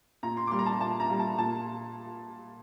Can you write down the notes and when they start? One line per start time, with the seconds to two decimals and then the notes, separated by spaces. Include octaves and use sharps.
0.23 A#2 A#5
0.37 C6
0.47 D6
0.51 G3 A#3 C6
0.59 A#5
0.66 A5
0.81 A#2 A5
1.00 A#5
1.10 G3 A#3
1.19 A5
1.38 A#2 A5